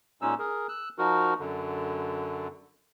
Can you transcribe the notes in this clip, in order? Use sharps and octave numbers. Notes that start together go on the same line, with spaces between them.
A#2 G#3 C#4 D#4 E6
G#4 A#4
E6 F#6
F3 D#4 F#4 A#4
F#2 D3